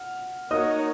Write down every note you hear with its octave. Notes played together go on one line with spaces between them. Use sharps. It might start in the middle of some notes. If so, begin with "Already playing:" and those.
Already playing: F#5 F6
A#3 D#4 F#4 A#4 C#5 D#5 D#6